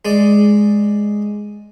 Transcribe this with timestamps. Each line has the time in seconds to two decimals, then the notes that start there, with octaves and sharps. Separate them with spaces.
0.05 G#3 D5